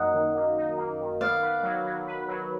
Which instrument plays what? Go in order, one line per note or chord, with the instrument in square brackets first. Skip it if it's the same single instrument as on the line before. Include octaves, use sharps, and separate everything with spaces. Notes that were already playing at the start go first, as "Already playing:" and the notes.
Already playing: [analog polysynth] F#2 A#3 D#4 [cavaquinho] D#5 F#5
[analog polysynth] D#3
A#3
D#4
A#3
D#3
[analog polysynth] B3 [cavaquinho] D5 F5
[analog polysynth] B4
F#3
F#3
B4
F#3